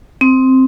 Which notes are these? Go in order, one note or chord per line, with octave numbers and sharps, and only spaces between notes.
C4